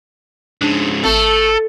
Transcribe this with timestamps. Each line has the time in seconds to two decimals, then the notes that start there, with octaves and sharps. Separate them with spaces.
0.61 G#2 C#3 D4
1.04 G#1 A3 A4